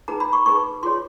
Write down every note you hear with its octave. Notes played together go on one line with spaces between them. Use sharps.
D#4 G#4 B4 A#5
B5
C#6
D#4 G#4 B4 C#6
F4 G#4 C#5 C6